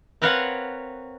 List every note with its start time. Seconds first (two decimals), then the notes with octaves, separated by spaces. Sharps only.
0.22 C4 A#4 B4 C#5 F5 F#5